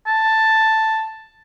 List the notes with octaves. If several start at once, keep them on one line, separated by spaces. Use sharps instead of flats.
A5